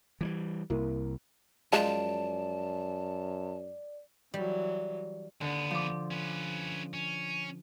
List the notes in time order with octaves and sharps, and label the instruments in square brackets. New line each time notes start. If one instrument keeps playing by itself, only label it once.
[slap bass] E3 F3 G3
[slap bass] C2 [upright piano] A#3 E4
[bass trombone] F#2 [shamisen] F3 G#3 [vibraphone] D5 [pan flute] A5
[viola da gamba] E3 F#3 [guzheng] G3
[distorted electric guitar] D#2 B3 [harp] D3
[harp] F3 D6
[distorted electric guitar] C#4 B4
C#4